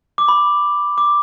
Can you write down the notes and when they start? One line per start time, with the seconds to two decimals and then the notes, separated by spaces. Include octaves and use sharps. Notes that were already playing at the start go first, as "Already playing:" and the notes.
0.18 D6
0.28 B5
0.98 D6